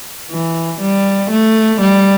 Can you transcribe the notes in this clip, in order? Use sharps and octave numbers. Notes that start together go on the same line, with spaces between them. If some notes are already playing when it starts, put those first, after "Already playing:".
E3
G3
A3
G3